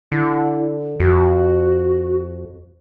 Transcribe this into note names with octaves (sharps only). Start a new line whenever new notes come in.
D3 E4
F2 F#4